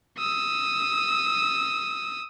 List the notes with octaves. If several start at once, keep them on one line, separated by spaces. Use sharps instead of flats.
D#6 E6